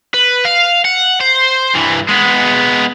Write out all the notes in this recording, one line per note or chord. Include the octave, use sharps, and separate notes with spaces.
B4
F5
F#5
C5
G2 E3
G#3 B3